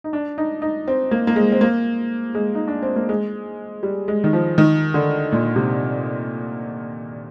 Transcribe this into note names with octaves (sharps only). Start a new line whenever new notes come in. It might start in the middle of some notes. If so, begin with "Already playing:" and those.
D#4
D4
D#4
D#4
C4
A#3
A#3
G#3
C4
A#3
G#3
D#4
D4
C4
A#3
G#3
G3
G#3
D#3
F3
D#3
D3
A#2
C3